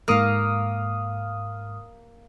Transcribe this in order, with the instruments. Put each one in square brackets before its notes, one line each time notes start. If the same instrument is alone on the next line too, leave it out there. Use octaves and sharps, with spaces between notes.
[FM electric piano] G#2 D#6 F6 [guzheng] A#3 F5